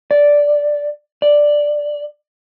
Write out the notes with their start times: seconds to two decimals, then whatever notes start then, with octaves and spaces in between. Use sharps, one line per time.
0.11 D5
1.22 D5